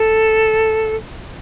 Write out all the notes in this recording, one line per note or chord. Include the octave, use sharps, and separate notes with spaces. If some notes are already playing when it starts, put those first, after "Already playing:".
Already playing: A4